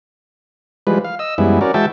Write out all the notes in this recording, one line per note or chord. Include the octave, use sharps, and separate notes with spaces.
E3 F3 G3 G#3 B4
F5
D#5 E6
F#2 E3 G3 G#3 B3 E4
C#4 F#4 A#4 D5
E3 G#3 F#4 E5 G5 A5